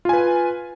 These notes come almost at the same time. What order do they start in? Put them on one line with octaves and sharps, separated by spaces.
F4 G#5 B4